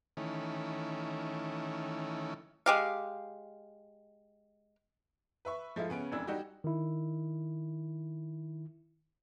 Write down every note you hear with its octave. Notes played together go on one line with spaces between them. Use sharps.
D#3 E3 A3 C#4
G#3 G4 F5
B4 E5 C#6
F3 G#3 A3 E4 F4
C#3 B3 C#4 D7
E1 F2 E3 D4 E6
G3 D#4 F#4 G4
D#3 E4